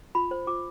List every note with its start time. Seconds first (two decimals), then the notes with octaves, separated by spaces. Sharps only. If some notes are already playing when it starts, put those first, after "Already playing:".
0.15 F4 B5
0.31 C5
0.47 F4 D6